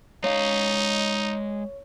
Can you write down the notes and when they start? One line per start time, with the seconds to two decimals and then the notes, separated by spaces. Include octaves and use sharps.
0.24 G#3 D#4 C#5 F5